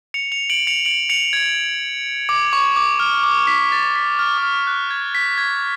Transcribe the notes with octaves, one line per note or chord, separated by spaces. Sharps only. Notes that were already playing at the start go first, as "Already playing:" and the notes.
C#7 F7
C#7 F7
D7 F#7
C#7 F7
D7 F#7
C#7 F7
G#6
D6
C#6
D6
F6
D6
B6
A6
B6
F6
D6
F6
F#6
G#6
B6
G#6